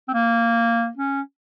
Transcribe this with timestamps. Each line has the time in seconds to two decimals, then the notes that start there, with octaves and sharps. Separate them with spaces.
0.08 C4
0.13 A#3
0.97 C#4